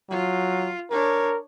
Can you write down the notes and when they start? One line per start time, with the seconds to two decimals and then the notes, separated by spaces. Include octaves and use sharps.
0.10 F#3 F4
0.90 D4 A#4 C#5